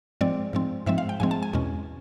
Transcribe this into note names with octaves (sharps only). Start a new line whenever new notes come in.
G#2 F3 G#3 C4 D5
G#2 F3 G#3 C4
G#2 F3 G#3 C4 E5
F5
G5
G#2 F3 G#3 C4 G#5
A5
G#5
E2 B2 G#3 C#4